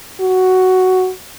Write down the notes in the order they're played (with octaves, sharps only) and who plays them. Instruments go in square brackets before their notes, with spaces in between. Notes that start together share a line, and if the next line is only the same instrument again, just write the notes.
[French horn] F#4